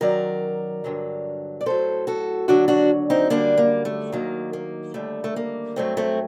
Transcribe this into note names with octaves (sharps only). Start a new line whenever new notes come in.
F#2 D#3 F#3 A#4 D5
G2 D3 F#3
D5
A2 F#3 A4 C5
F#4 A4
D#2 D3 F#3 D4 F#4
D4 F#4
C4 D#4
F#2 D3 G3 A#3 D4
A#3
A3
D#2 D#3 F#3 A#3
A#3
D#2 D3 G3 A3
A3
A#3
G2 F#3 A3 C4
A3 C4